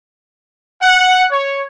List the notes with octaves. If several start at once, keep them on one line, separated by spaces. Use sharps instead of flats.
F#5
C#5